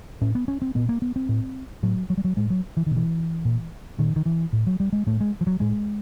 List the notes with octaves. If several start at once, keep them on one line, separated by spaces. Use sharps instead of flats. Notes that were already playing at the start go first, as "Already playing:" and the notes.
A2 C#4
B3
C#4
C4
A#2 B3
A#3
B3
C4
A2
A2 F#3
F#3
G3
F#3
A2 G#3
F#3
E3
D#3
B2
E3
A#2
A#2 D#3
D#3
E3
A2
F#3
G3
G#3
A2 A3
G#3
F3
F#3
A2 G#3